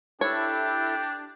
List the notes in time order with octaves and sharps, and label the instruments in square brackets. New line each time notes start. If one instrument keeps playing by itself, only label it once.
[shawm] D4 [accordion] E4 A4 [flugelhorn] G4 [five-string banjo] C#5